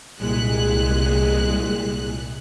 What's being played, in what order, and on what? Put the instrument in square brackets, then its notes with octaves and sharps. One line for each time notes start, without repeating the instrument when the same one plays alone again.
[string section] C2 A#2 G#3 F#6